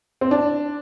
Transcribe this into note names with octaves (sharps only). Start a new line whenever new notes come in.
C4
D4